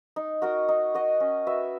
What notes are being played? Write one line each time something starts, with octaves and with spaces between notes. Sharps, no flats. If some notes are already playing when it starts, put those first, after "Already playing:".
D#4
F#4 A#4 D#5
D#4
F#4 A#4 D#5
C#4
F#4 B4 E5